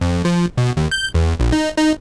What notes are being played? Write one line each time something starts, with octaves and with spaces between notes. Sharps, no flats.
F2
F3
B2
D#2
G6
E2
A#1
D#4
D#4